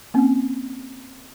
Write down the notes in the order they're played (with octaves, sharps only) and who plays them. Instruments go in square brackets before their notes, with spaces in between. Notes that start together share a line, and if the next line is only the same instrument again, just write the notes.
[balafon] A#3 C4 C#4